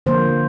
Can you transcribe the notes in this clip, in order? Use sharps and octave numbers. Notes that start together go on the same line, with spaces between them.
D3 F3 A#3 C5